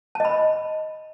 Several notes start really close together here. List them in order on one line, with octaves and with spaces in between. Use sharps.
A5 D#5 B5